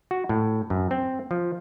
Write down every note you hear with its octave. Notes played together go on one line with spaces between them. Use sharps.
F#4
A2
F#2
C4
F3